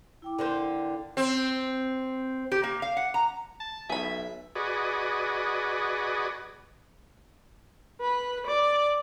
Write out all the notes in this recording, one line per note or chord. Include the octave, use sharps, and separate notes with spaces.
E4 G5 D6
D3 A#3 C5
C4
G4
A#3
F5
F#5
A#5
A5
B1 G#4 E5 B5
F#4 G#4 B4 D5 D#5
B4
D5